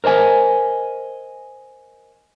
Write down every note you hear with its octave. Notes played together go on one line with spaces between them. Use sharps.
A#4 C5 D#5 G#5